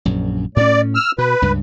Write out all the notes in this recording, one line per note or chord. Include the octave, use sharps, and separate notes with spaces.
A#1 F#2
A2 C#4 D5
E6 F6
B2 B4
C#2 G2